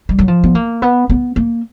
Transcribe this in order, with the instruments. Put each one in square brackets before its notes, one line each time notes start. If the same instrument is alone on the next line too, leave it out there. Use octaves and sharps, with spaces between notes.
[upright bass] G3
F#3
F3
B3
A#3
B3
B3
A#3